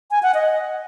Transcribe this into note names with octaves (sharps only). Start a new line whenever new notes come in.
G#5
F#5
D#5